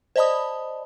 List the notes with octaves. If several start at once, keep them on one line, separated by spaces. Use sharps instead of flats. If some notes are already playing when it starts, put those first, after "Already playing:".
C5 D5 D#5 A5 B5 D#6